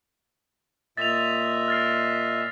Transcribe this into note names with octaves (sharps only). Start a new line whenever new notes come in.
A#2 D#5 E5 A6 F7
F6 A6 C7